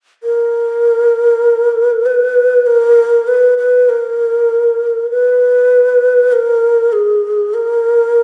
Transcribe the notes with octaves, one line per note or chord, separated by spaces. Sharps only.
A#4
B4
A#4
B4
B4
A#4
B4
A#4
G#4
A#4